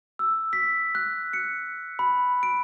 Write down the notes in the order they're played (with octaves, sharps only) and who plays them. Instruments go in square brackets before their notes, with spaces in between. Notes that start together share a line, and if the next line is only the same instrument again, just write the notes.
[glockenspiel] E6
B6
F#6
C#7
B5
D7